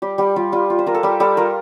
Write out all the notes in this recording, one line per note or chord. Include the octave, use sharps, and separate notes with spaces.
G3 G4
G3 G4
G3 F4
G3 F4
F4
C5
F4 A#4
A4
G3 G4
G3 A4
F4 A#4